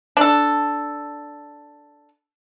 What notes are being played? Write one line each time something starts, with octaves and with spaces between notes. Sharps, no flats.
D4 A4